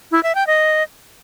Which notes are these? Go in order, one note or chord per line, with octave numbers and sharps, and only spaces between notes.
E4
E5
G5
D#5